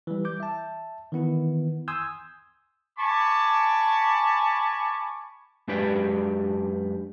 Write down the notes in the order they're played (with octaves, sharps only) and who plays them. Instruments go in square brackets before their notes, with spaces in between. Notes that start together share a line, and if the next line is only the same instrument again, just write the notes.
[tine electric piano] E3 G3
D6 G6
E5 A5
D#3 E3 B3 E4
G#5 C6 D#6 E6 G6 G#6
[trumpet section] G#5 A5 B5 C#6 D6
[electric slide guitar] F#2 G#3 D4 G4 B4 D5